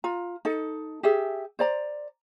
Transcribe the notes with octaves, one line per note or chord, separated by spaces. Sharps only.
F4 A#5
D#4 A4
G4 G#4 E5
C5 D5 A#5